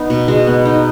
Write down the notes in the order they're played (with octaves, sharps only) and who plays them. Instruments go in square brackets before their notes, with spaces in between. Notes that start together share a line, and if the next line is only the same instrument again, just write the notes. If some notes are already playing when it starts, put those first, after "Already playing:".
Already playing: [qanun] B3 D#4
B2
G#3 F#4
B3
D#4